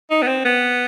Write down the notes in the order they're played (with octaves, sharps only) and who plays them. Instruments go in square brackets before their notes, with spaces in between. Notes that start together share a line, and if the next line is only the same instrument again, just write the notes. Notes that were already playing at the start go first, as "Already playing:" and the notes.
[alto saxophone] D#4
B3
C4
B3